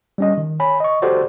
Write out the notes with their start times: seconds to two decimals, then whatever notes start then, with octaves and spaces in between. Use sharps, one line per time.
0.18 G3 C#4 D#5
0.37 D#3
0.60 C#5 G#5 B5
0.80 D#5 C#6
1.02 F#4 G4 A4 C5 D5